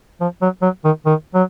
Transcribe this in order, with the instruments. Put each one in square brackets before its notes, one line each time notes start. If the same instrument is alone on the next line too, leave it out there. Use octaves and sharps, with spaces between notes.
[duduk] F3
F#3
F#3
D#3
D#3
F#3